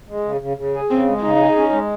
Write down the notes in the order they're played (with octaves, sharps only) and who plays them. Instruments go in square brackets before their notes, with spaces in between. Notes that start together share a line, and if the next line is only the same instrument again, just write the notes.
[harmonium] G#3
C#3
C#3
C#3
G#4
[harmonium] C#3 [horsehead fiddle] C4
[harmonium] G#3
[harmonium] C#3 [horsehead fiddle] D#4
[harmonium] G#4
C#4
G#3